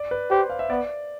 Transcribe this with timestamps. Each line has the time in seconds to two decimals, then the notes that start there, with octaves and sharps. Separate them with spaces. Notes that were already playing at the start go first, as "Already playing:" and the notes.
Already playing: D5
0.11 B4
0.30 G4 C5
0.50 F5
0.59 E5
0.70 B3 D5